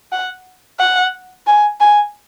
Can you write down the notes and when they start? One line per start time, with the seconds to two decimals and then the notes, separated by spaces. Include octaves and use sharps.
0.12 F#5
0.79 F#5
1.47 G#5
1.80 G#5